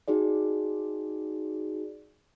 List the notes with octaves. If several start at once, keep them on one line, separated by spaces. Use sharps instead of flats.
D#4 F#4 G#4 D5